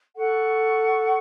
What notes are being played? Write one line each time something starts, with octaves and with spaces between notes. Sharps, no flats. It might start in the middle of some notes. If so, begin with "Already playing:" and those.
A4 F#5 C#6